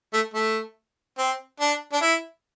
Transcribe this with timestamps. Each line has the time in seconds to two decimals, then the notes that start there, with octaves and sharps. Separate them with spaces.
0.13 A3
0.34 A3
1.18 C4
1.60 D4
1.92 D4
2.01 E4